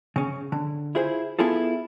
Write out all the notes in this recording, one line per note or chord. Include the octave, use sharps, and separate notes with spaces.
C#3 C#4
D3
E4 F4 G#4 C5
B3 E4 F4 G#4 A4